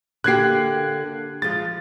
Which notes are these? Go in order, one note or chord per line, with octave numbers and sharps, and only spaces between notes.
D3 A#3 G4 F#6 G#6 C7
F3 G#3 A6